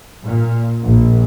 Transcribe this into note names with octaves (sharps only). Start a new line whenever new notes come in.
A#2
A#1